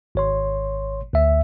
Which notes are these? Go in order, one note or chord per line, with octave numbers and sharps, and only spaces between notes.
G#1 C#5 C6
D2 E5